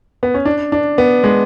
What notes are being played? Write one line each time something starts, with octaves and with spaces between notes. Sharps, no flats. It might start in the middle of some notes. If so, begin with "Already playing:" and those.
B3
C#4
D4
D4
B3
G#3